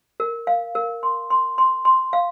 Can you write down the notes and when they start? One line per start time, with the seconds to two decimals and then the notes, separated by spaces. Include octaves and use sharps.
0.20 A#4
0.47 F5
0.75 A#4
1.03 C6
1.30 C6
1.58 C6
1.85 C6
2.13 F5